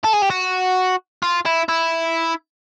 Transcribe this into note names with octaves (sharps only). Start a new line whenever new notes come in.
A4
G#4
G4
F#4
F4
E4
E4